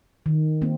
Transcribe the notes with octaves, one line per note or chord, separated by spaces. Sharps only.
D#3
A#3 C4